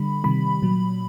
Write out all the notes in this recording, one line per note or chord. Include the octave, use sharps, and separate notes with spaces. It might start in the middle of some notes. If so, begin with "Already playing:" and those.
Already playing: D3 G3 B5
C3 D#3 G3 B5
A#2 F#3